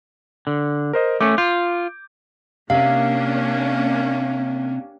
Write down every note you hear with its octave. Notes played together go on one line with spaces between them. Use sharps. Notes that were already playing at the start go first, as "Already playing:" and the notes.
D3
A#4 C5 D#5
A3 C#4 D6
F4 G6
C3 A#3 C#4 D4 F5